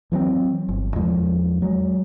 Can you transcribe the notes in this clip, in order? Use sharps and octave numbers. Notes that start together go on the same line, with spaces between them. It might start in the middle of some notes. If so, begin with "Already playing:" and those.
E3 F#3 B3 C4
G1
E2 F3 G#3
F#3 G#3